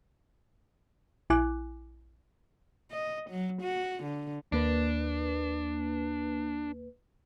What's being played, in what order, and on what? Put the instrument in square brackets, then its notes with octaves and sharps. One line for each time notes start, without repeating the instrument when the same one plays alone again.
[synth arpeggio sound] A#1 E4 G#5 D6 F#6
[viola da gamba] D#5
F#3
F#4
D3
[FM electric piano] D#2 A#3 B4 [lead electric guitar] D4